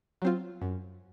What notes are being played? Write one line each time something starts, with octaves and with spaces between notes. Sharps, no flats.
F#3 C4 F4
F#2